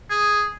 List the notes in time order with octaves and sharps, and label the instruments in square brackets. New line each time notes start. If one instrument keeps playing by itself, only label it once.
[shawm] G#4